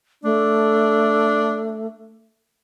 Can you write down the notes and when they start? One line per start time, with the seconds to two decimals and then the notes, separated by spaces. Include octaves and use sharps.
0.24 A3 D4